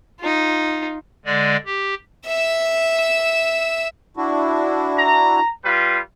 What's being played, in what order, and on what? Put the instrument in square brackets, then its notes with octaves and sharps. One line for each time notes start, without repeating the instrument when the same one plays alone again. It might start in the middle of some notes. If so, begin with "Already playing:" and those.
[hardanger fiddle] D#4 F4
[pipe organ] D3 G#3 D5
G4
[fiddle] E5 E6
[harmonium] D4 E4 F#4
[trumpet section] A#5
G3 F4 B4